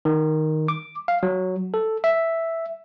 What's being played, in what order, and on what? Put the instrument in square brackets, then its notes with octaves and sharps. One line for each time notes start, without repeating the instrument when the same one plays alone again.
[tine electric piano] D#3
D6
F5
F#3
A4
E5